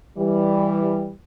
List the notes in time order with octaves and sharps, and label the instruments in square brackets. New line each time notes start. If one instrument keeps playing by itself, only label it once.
[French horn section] E3 G3